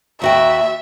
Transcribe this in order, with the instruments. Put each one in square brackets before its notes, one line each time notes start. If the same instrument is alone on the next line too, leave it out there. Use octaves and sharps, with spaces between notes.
[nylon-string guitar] D#2 F#4 G5 [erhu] E5